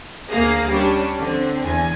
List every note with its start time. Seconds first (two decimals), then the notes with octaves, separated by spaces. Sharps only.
0.29 D2 A#3 G#4 F5 A#6
0.70 G3 C#4 D4
1.18 D3 C4
1.62 E2 G#5